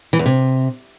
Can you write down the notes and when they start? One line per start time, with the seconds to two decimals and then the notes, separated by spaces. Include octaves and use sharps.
0.13 E3
0.19 E2
0.26 C3